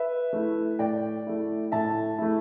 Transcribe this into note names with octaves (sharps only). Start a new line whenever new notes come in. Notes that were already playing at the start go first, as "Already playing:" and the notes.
Already playing: B4 E5
A3 E4
A2 D5 G5
A3 E4
A2 E5 A5
A3 E4